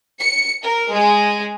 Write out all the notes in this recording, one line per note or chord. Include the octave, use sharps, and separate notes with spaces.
C#7
A#4
G#3